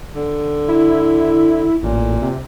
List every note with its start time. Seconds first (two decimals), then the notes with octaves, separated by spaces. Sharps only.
0.15 D3
0.68 E4
1.83 A1 A#2
2.22 C3